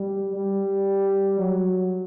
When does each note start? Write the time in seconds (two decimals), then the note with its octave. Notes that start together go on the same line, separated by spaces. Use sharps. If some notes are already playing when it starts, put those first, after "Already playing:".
Already playing: G3
0.36 G3
1.39 F#3